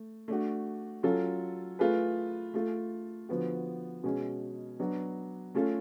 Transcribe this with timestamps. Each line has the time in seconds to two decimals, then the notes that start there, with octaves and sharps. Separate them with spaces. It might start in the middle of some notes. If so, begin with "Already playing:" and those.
Already playing: A3
0.28 A3 D4 F#4
1.03 F#3 C#4 F4 A4
1.79 A3 F4 G#4 B4
2.54 A3 F4 A4
3.29 D3 F3 B3 F#4
4.04 B2 G#3 C#4
4.79 F#3 B3 D4 F#4
5.55 A3 C#4 F4 A4